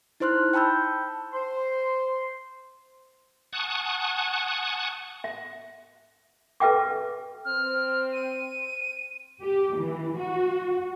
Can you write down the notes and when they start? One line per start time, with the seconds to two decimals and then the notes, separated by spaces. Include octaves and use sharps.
0.20 D#4 E4 C5 C6 F6 F#6
0.54 G5 A5 B5 E6 G6
1.32 C5 C6
3.53 F#5 G#5 A5 C#6 D#6 F#6
5.24 E5
6.60 A4 B4 E5 G5 D6
7.45 C4 C5 F6
8.13 D#7
9.42 G4
9.77 E3
10.19 F#4